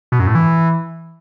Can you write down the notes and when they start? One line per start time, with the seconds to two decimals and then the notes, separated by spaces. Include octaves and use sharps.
0.12 B2
0.20 F#2
0.27 A2
0.35 E3